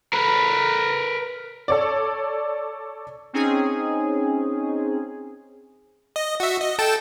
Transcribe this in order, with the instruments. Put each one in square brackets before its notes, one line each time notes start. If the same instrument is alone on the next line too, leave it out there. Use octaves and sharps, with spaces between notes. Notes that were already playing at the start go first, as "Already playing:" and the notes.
[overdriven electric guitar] A#4 B4
[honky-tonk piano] A4 C#5 D5
[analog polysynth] C4 C#4 D#4 G#4
[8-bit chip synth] D#5
F#4 E5
D#5
A4 G5 A5